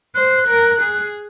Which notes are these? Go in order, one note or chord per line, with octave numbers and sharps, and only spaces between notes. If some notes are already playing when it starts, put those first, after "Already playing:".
C5 F#6
A#4
G#4